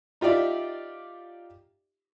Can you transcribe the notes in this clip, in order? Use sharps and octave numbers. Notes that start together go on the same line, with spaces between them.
D#4 F4 G4 D5 E5